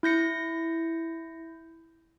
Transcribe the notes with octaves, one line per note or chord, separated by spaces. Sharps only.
E4 G6 A#6 C#7